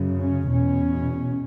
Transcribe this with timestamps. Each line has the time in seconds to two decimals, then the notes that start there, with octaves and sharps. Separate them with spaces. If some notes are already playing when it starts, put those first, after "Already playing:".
Already playing: F#2 C#3
0.20 C#4
0.49 E2 B2 C#4